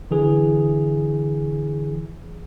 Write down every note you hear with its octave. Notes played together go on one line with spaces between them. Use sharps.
D3 E3 G#4